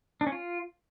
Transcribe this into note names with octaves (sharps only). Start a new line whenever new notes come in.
D4
C#4
F4